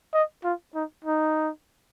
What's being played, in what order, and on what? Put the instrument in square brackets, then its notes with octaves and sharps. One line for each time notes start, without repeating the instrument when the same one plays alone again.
[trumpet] D#5
F4
D#4
D#4